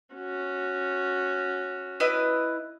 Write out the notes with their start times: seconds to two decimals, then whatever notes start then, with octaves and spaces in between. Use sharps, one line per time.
0.14 C#4 F#4
2.00 E4 B4 D#5